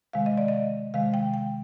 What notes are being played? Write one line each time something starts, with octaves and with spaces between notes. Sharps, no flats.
C3 D#3 G#3 F5
D#5
D5
D#5
C3 D#3 G#3 F5
G5
G5